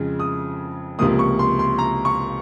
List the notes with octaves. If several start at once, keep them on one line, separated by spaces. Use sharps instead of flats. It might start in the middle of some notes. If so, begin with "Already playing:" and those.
Already playing: F2 C#3 G#3
D#6
C#2 C3 F3 A#3 D#6
C#6
C6
C6
A#5
C#6